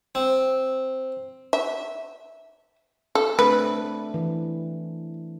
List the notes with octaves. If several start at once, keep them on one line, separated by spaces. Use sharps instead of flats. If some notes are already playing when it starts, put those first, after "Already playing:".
C4
E5
A4
A3 C4 D4 B4
E3